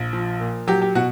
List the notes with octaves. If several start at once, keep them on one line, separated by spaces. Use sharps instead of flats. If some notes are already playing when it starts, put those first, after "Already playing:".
Already playing: A#1
F3
A#2
F#3 G4
G4
B2 F#4